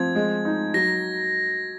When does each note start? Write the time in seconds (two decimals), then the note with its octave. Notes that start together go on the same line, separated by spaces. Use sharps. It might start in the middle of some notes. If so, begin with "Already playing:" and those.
Already playing: F3 C4 G#6
0.15 G#3
0.45 D#4
0.74 F#3 A#6